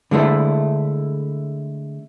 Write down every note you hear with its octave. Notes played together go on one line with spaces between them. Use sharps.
D3 G#3 A3 E4